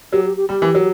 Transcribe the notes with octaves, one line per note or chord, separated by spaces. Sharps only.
F#3 G4
G4
G4
G3 G4
E3
F#3